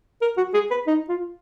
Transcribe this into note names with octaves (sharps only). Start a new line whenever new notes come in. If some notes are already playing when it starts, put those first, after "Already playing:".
A#4
F#4
G#4
B4
D#4
F4